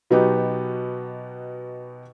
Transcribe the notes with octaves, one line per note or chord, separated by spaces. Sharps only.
B2 F#3 B3 D#4 G4